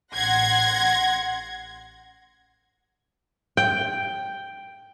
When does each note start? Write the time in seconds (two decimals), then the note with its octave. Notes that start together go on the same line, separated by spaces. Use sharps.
0.13 A1 F#5 C6 G#6 A#6
3.57 G5